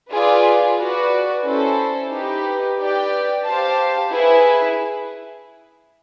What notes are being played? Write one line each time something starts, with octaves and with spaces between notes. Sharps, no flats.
F4 G#4 B4 D5
F#4 B4 D5
C#4 E4 A4 C5
D#4 G4 B4
G4 B4 D5 G5
G4 C5 F5 A5
E4 G#4 B4